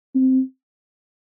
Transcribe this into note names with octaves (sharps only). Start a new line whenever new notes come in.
C4